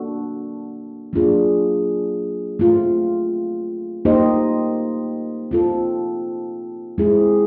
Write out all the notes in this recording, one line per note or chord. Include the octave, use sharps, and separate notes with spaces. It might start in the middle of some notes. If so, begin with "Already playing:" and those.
Already playing: A#3 D4 F#4 A4
F#3 A#3 D4 F4 G#4
A3 C4 F4
A#3 D#4 G4 C5 D#5
C4 F4 A4
G#3 C4 E4 G#4